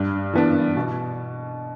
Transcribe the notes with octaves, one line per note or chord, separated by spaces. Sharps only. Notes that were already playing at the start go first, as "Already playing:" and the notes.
Already playing: G2
E3 B3 D4
B2